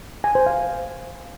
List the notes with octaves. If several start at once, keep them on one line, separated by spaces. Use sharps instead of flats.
G#5
C5
F5